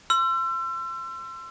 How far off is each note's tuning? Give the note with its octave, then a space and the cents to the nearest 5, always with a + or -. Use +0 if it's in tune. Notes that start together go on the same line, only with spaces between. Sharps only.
C6 +0 E6 +35